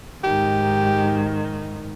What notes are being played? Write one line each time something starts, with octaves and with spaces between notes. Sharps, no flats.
G#2 D#3 G4